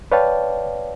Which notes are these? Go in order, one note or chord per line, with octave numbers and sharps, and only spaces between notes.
B4 C#5 D5 F5 G5 A5